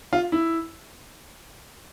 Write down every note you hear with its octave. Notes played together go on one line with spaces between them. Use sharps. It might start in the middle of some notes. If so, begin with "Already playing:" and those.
F4
E4